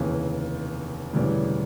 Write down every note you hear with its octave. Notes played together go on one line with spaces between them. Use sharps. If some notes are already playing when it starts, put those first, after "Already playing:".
Already playing: F1 D#2 C#3 E3
E1 D2 C#3 E3 G3